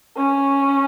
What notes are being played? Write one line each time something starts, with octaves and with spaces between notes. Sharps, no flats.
C#4